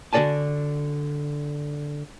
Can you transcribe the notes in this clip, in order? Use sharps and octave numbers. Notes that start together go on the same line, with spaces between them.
D3 F#4 A4 D5 G#5 A5